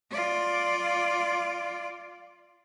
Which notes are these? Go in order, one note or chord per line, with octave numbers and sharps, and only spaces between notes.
F4 D5